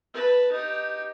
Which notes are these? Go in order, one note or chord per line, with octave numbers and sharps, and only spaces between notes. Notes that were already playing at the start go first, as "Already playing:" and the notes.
B4 A5
D#4 G4